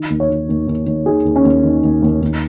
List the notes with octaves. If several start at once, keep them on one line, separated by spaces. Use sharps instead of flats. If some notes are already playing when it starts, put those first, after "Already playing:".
Already playing: D#3
D#2
C#5
D#3
D#2
D#2
D#2
D#3 G#4
D#2
C#4
D#2
D#3
D#2
D#2
D#2